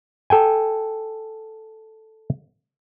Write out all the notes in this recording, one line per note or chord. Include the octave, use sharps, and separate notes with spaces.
A4 G5 G#5